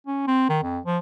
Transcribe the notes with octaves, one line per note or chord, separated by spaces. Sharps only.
C#4
C4
D#3
F2
F3